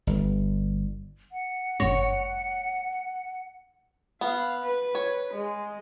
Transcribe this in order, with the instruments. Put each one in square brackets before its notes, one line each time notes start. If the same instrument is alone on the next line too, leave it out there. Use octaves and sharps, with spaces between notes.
[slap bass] G1
[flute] F#5
[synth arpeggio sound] G1 F#2 A#6 [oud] C#5
[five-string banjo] B3 [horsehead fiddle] F5
[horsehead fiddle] B4
[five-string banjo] C#5
[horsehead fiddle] G#3